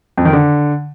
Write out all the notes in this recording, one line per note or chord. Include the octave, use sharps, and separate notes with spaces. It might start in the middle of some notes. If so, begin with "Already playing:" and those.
F2
D#3
D3